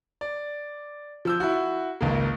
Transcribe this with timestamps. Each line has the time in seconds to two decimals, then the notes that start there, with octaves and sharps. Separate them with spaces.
0.21 D5
1.25 F3 E6 G6
1.40 E4 F#4
2.01 G#1 C#2 A#3